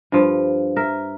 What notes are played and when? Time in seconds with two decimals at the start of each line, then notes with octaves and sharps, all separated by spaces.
0.12 G2 F3
0.77 A#4 E5